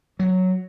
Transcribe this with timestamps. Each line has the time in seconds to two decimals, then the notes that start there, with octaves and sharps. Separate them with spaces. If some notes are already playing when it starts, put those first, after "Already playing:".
0.19 F#3